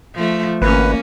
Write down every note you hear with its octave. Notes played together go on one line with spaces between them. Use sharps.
F3 A3
G#1 A#3 C#4 B4